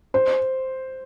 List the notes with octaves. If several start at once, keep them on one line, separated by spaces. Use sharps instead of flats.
C5